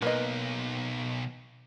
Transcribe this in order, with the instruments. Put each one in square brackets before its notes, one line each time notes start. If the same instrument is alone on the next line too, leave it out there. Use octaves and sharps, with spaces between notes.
[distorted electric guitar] B1 [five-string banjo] A#3 B4 D#5